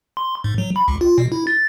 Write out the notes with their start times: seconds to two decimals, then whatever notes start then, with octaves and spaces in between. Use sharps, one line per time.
0.17 C6
0.44 G#2
0.58 F#3
0.76 B5
0.88 C#2
1.01 F4
1.18 B2
1.32 E4
1.47 A6